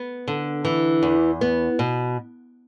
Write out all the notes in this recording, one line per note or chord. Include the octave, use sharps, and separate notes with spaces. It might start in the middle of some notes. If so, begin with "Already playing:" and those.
Already playing: B3
D3
E3
E2
B3
B2